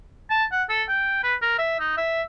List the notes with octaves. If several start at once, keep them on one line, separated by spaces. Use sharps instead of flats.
A5
F#5
A4
G5
B4
A#4
E5
D#4
E5